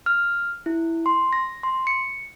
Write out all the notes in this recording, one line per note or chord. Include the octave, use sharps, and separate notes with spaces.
F6
E4
C6
A#6
C6
C#7